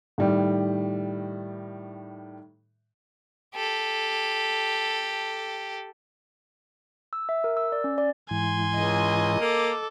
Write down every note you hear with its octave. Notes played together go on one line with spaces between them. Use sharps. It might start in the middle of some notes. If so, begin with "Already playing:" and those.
A2 D#3 G3
G4 A4
E6
E5
A#4
E6
D5
C#4
D5
G#2 E3 G#5 C6
C#2 D#5
A#3 A4 D6